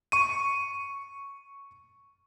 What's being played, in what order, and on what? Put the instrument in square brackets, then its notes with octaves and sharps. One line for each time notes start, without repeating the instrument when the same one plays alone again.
[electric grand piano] C#6 D#7